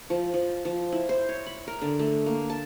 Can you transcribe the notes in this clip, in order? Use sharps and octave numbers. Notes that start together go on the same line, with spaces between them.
F3
F3
F3
E4
C5
C#5
B5
A#4
D3
A3
A#3
A5